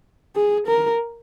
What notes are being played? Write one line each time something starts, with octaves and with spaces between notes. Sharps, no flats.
G#4
A#4